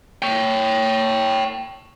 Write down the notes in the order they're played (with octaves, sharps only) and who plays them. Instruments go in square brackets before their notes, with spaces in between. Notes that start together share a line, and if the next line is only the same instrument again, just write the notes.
[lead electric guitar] C#5 G5